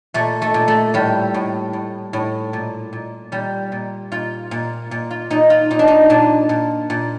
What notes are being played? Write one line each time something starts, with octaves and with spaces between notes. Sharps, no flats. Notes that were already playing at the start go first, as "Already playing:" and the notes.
A#2 A3
A3
A#2
A3
A2 G3
A2
A2
A2
A#2
A#2
A#2 G3
A#2
A#2 F4
A#2
A#2
F4
A#2 D#4
F4
A#2 D#4
D4
D#4
A#2 D4
A#2
A#2